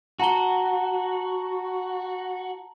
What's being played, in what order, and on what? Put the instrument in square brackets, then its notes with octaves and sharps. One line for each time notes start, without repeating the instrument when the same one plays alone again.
[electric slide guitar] F#4 [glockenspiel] A5 A#5 G7